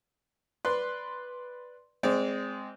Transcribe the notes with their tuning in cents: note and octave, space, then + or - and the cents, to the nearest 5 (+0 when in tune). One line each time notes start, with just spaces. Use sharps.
B4 +0 D5 +0 C6 +0
G#3 +0 C4 -10 D5 -30